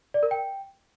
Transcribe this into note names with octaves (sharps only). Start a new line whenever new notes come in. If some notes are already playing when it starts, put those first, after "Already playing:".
D5
A#4
G5